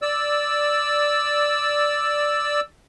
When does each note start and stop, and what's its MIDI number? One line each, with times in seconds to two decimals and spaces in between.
0.02 2.60 74
0.02 2.60 88